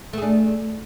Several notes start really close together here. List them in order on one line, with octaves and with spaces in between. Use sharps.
A3 G#4 D4